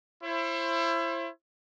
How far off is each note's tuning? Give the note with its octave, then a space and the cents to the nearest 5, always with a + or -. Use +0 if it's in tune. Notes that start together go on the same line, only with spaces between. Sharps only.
E4 +30 C5 +35